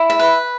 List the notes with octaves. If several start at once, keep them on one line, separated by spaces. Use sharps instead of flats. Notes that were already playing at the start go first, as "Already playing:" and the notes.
Already playing: E4
E5
B4